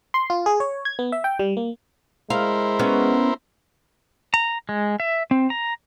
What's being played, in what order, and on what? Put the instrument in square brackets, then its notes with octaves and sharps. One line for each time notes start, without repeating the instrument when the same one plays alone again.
[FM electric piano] C6
F4
G#4
C#5
G#6
B3
E5
G5
G3
A#3
[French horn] G#3 [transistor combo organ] E4 A#4 C5 [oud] F5
[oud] B3 C#4
[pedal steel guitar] A#5
G#3
E5
C4
A#5